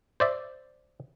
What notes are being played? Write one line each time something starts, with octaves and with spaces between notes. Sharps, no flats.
C5 D5 E5